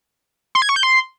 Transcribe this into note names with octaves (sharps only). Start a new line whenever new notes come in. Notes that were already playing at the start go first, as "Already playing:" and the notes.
C6
G#6
C#6
G6
C6